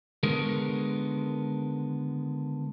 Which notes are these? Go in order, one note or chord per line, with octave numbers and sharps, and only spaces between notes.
D3 D#3 G#3 B3 G#4 A#4